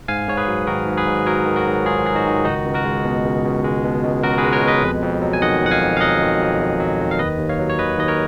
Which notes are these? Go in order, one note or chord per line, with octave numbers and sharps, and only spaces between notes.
G#2 F5 G#5
G#2 C#5
G#4 B4
F#3
D#3 F#4 A#4
G#2
G#4 B4
G#2
F#3 A#4 C#5
D#3
F#4 A#4
G#2
G#2 F4 G#4
F#3 G#4
D#4 F#4
D#3
C#2 D#4 F#4
C#2
F#4 A#4
G#3
B2
C#2
C#2
G#3
B2
C#2
C#2 F#4 A#4
G#4 B4
G#3
A#4 C#5
B2
B4 D#5
F2
F2
F#3
G#5
D#3 D#5 F#5
F2 F#5
F5 G#5
F2
F5
F#3 D#5 F#5
D#3
F2
F2
F#3
D#3
F5
D#2 B4 D#5
D#2
C#5 F5
F#3
C#5
D#3 B4 D#5
D#2 D#5
A#4 C#5